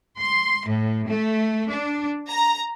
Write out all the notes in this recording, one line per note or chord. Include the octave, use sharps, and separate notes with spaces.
C6
A2
A3
D4
A#5